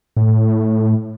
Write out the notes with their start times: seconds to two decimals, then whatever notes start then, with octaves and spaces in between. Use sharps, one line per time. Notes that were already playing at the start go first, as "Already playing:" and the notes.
0.17 A2